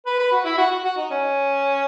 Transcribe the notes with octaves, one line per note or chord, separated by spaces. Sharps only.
B4
B4
F#4
E4
F#4
F#4
F#4
D#4
C#4